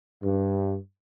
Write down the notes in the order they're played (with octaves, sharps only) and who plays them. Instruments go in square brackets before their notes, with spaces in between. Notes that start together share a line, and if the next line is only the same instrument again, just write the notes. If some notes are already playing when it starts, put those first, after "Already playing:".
[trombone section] G2